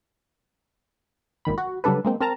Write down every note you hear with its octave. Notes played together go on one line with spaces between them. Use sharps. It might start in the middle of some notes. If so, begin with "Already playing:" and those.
G#1 A#2 D#3 B5
F#4
C#3 F#3 G3 D4 A4 B4
G#3 A#3 C4
C4 A#4 A5 A#5